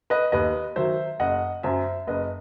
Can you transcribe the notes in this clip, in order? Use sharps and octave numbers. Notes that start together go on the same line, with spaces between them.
B4 D#5
D#2 B4 D#5
D#3 F#3 C5 E5
F#1 D#5 F#5
F#2 F#3 C5 E5
F#1 B4 D#5